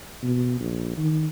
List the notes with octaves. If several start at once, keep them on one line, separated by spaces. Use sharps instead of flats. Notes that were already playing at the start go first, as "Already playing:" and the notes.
B2
A#1
D#3